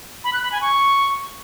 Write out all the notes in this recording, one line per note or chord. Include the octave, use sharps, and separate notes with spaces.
B5
F#6
B5
G#5
C#6